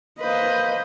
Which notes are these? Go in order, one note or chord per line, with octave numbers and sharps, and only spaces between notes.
A#3 B4 C5 D#5